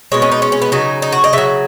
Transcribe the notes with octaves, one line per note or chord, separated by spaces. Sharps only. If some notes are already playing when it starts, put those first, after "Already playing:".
B2 G#3 C#5
C#4
D#4
C#4
C#4
B3
C#3 F#3 D#4
D#4
F#4
D#5
C#3 F#3 E5